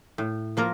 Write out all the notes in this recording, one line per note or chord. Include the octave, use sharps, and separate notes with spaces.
A2
F3 A#3 F4 A#4